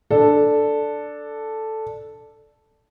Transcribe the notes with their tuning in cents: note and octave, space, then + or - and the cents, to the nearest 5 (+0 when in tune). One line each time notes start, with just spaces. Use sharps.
D4 +0 A4 +0